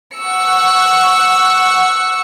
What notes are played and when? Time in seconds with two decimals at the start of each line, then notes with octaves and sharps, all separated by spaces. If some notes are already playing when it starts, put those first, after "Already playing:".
0.17 F#5 C#6 E6 C#7